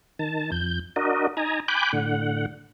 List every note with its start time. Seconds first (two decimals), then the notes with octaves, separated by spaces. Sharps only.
0.19 D#3 A5
0.52 F2 G6
0.96 D4 F#4 A#4 D#5
1.37 D#4 G#5 A#5
1.68 G5 G#5 B5 D6 F#6 G6
1.93 A2 D3 F#5